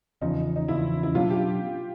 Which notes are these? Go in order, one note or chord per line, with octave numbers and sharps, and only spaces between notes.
E2 C#3 F3 D#4
D#4
E2 C#3 F3 E4
E4
B2 F#3 B3 D4 F4
G4